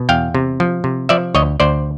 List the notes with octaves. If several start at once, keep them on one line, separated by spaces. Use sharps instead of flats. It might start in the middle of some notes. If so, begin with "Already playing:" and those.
Already playing: B2
E2 F5 G5
C3
F3
C3
F3 D5 E5
D2 C#5 D#5
D2 C5 D5